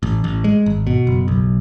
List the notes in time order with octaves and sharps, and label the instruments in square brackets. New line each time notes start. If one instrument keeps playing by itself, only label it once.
[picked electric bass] A1
A1
G#3
G#1
B2
F#1
B1